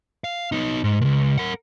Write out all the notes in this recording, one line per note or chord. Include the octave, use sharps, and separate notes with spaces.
F5
B3 D#4
G#2
C#2 A#2
A#4 F#5